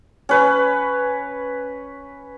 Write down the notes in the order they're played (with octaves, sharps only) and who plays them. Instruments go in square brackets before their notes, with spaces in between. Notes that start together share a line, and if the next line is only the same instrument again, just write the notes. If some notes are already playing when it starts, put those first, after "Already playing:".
[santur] C#4 B4